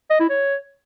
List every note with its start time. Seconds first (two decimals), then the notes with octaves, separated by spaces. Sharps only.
0.10 D#5
0.20 E4
0.30 C#5